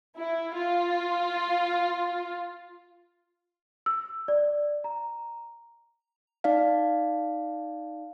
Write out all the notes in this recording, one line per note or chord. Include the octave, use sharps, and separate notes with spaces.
E4
F4
E6
D5
A#5
D#4 D5 F5